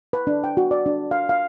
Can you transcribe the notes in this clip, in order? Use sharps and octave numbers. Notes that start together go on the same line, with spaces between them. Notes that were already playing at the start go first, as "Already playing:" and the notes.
B4
D4
G5
F#4
D5
D4
F5
F5